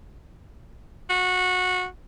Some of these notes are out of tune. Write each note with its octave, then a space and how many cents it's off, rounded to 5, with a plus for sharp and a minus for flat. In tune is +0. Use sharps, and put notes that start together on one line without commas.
F#4 -15